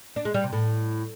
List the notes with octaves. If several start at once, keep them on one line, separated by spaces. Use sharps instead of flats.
D4
G#3
G3
C3
A2